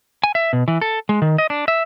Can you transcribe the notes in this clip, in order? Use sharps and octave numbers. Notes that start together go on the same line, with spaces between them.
G#5
E5
B2
E3
A4
G#3
D#3
D#5
D4
E5